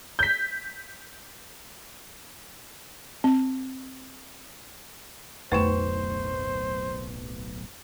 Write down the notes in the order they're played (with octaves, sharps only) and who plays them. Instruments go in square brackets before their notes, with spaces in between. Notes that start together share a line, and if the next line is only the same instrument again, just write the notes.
[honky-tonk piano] G6 B6
[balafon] C4
[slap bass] D1 B1 [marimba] F2 A3 [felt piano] B4 C#6 E7 [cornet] C5